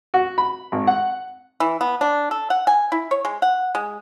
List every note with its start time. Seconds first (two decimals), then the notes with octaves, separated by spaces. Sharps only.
0.14 F#4
0.38 B5
0.72 G#1
0.87 F#5
1.60 E3
1.81 B3
2.01 D4
2.31 A4
2.50 F#5
2.67 G#5
2.92 E4
3.11 C#5
3.25 G#3
3.42 F#5
3.75 G#3